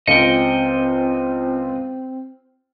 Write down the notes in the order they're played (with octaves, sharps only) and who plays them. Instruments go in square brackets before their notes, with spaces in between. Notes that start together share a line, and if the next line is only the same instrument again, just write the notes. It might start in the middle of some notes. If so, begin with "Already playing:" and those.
[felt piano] C#2 F4 [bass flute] C4 [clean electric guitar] D#5 G5 [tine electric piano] C#7